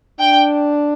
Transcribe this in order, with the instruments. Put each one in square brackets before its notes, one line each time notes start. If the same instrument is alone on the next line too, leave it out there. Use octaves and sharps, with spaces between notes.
[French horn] D4 [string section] G5